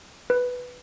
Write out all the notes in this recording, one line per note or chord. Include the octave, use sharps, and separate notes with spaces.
B4